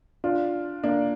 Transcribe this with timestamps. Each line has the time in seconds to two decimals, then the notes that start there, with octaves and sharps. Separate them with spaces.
0.24 D4 F4
0.84 A#3 D4